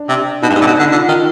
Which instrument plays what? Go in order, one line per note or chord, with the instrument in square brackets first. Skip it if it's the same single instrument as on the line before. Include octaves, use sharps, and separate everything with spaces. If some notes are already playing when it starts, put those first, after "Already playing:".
Already playing: [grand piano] D4
[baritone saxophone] C3
[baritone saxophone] B2 [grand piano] D#4
[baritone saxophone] G2
G#2
[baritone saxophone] C3 [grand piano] D4
[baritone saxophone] B2
[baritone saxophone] D3 [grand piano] D#4
[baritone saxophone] D3 [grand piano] F4
[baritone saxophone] D#3 [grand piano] D#4